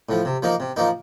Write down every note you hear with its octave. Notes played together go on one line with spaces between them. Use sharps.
A2 F3
C3
F3 A#3 D#4
C3
F3 A#3 D#4